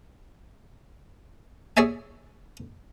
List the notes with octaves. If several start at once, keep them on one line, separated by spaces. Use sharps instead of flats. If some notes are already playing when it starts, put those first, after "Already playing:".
G#4 C#5 D5 E5 G#5